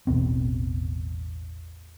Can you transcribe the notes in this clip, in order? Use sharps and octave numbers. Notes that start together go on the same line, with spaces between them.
A1 E2 B2 C4